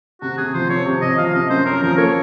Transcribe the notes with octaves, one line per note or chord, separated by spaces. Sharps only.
C3 F#4
C3 G#4
F3 C5
C4 C#5
C3
C3 D#5
F3 F5
C4 D#5
F#2 C5
C#4 A#4
F3 A#4
A#3 C#5